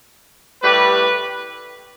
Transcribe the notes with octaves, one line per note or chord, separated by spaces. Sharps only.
A2 G3 G4 B4